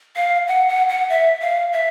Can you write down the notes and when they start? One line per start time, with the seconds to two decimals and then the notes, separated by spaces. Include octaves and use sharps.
0.16 F5
0.48 F#5
0.68 F#5
0.89 F#5
1.09 E5
1.42 F5
1.72 E5